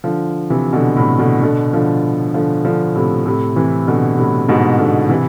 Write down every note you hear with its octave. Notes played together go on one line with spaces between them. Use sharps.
D3 F3
C3 E3
B2 D3
A2 C3
B2 D3
B2 D3
D3 F3
D3 F3
D3 F3
A2 C3
A2 C3
C3 E3
B2 D3
A2 C3
G#2 B2
B2 D3
C3 E3